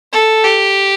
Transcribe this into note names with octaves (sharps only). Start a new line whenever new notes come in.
A4
G4